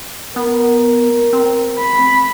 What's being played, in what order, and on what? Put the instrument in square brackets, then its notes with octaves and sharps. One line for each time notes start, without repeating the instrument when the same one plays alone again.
[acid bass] B3 [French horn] A#4
[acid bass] C4
[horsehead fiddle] B5